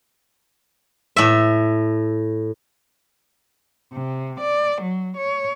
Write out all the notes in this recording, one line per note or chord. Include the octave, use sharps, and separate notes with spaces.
A2 E5
C3
D5
F#3
C#5